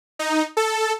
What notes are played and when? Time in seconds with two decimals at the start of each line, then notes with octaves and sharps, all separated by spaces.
0.19 D#4
0.57 A4